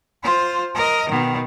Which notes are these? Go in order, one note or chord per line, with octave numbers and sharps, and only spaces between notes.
F4 C5
A#4 D#5
B2 D#3